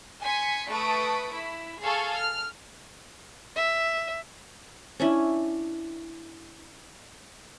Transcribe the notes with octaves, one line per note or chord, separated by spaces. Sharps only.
G#5 C6 B6 C#7
A3 B4 A5 C#6 D#6 D7
E4
G#4 A4 F5 C#6
F6
E5
C#4 D4 E4